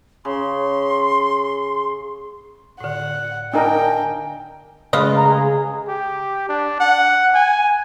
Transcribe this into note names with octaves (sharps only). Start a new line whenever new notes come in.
C#3 C6
A2 D3 F#5
D4 D#4 A#4 G5 G#5
C#3 G#3 A3 F4 B4 D#5
A#5
G#4
G4
D4
F#5
G#5